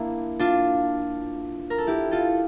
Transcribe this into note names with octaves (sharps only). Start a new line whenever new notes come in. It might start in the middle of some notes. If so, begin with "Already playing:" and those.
Already playing: A#3 D4 E4
D4 F4
A#4
A4
E4 G4
F4 A4